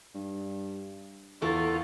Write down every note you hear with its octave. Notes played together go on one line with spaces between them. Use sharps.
G2
E2 E3 A3 F4 A4 A#4